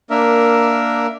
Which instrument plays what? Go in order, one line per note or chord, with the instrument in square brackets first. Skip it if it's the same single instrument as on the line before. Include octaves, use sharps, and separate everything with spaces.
[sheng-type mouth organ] A#3 D4 A#4 E5